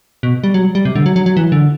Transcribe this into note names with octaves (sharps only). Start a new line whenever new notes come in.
B2
G3
F#3
G3
C3
D3
F#3
F#3
F#3
E3
D3